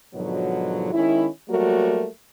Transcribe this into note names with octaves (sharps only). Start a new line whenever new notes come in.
G#2 B2 D3 F3 F#3
D#3 G#3 C#4 E4
F#3 G3 A3 A#3 F#4 A#4